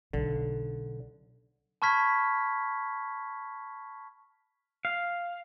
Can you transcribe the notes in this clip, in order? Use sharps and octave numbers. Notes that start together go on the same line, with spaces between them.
B1 D3
A5 B5 C#6 F6 G#6 B6
F5